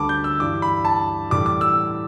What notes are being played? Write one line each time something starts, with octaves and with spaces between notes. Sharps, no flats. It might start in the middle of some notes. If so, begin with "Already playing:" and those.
Already playing: D2 D3 G3 A5 B5 D6
G6
E6
G2 E3 G3 D6
B5
A5
A2 E3 G3 D6
D6
E6